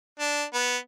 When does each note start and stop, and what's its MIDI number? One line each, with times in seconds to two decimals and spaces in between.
0.19 0.44 62
0.54 0.77 59